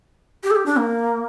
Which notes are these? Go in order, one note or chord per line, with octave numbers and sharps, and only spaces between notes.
G4
A4
G4
D4
A#3